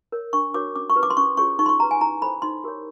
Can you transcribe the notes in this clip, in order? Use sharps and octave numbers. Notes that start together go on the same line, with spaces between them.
A#4 C#5
D4 C#6
F#4 A#4 C#5 D6
C#4 D6
C#6
E4 G4 B4
D6
C6
C#4 C#6
F4 G#4 C#5 C#6
D#4 C#6
C6
C#6
G4 B4 A#5
G#5
E4 A#5
A4 C5 B5
D#4 C6
G4 A#4 C#5